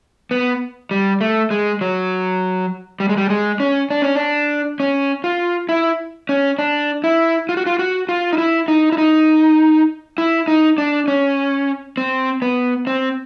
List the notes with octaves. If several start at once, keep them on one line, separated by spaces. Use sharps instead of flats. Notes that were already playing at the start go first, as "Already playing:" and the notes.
B3
G3
A3
G#3
F#3
G3
G#3
G3
G#3
C#4
D4
C#4
D4
C#4
F4
E4
C#4
D4
E4
F4
F#4
F4
F#4
F4
D#4
E4
D#4
E4
D#4
E4
D#4
D4
C#4
C4
B3
C4